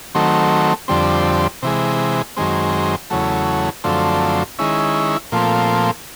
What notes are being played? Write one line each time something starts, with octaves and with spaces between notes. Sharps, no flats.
D#3 F#3 A3 C4
F2 D3 G3 C4
C3 E3 G#3
F#2 D#3 G#3 C4
E2 C#3 F#3 A3
F#2 D3 F3 A3 C4
D#3 G#3 C#4 E4
A#2 F3 A3 C4